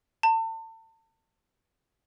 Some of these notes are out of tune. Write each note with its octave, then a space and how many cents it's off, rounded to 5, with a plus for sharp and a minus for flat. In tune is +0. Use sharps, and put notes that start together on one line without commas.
A5 +35